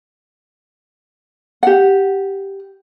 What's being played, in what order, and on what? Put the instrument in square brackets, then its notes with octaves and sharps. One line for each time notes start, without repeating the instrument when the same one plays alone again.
[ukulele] G4 F#5